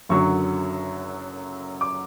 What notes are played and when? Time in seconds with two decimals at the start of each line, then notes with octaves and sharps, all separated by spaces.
0.09 F#1 F#2 D3 F#3 C#6
1.81 D6